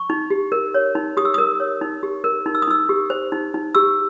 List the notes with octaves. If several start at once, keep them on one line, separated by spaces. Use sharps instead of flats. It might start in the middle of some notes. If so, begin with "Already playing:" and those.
Already playing: C#6
D#4
G4
A#4
C#5
D#4
G4 D#6
E6
A#4 D#6
C#5
D#4
G4
A#4
D#4
E6
D#6
D#4 E6
G4
C5
D#4
D#4
G4 E6